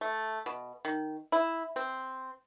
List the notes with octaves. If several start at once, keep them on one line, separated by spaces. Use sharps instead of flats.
A3
B2
D#3
E4
C4